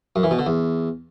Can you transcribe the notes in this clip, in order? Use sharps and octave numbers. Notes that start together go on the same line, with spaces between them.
F#2
E3
B2
D3
E2